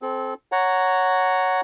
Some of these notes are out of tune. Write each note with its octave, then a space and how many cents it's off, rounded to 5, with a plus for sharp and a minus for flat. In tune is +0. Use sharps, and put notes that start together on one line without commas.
C4 +0 A4 -30
C#5 +5 F#5 +0 A#5 -10